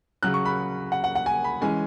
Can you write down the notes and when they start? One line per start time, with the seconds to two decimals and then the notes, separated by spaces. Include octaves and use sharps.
0.23 C#3 F#3 C#4 F#6
0.34 C#6
0.46 B5
0.92 F#5
1.04 F#5
1.15 F#5
1.26 G#5
1.44 B5
1.61 E3 G#3 C#4 G#5